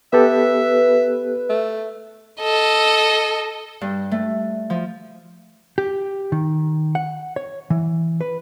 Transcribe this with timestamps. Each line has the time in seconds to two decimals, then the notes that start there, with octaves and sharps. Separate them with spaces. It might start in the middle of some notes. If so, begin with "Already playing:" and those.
0.13 B3 G4 A4 B4 E5
1.50 A3
2.41 A4 D#5
3.81 G2
4.11 A3
4.70 F3
5.78 G4
6.32 D#3
6.95 F#5
7.36 C#5
7.70 E3
8.21 B4